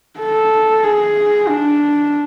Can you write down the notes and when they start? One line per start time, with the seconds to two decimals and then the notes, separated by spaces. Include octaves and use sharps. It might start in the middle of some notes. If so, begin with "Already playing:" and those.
0.19 A4
0.83 G#4
1.48 D4